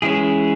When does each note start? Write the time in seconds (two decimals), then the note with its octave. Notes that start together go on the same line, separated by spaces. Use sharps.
0.02 E3 G#3 C#4 E4 G#4